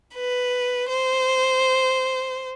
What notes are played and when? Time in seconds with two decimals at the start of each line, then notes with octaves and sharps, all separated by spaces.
0.15 B4
0.89 C5